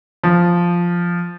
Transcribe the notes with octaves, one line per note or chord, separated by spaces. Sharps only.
F3